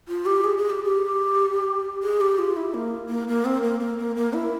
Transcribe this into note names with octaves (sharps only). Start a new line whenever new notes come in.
F4
G4
G#4
G#4
G4
G4
G#4
G4
F4
E4
A#3
A#3
A#3
C4
A#3
A#3
A#3
A#3
E4